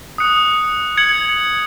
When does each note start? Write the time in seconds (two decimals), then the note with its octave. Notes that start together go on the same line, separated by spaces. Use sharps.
0.18 D#6 F#6 C#7
0.97 G#6 C#7 F#7